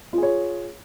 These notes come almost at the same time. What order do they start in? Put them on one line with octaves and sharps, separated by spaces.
F4 G#4 C#5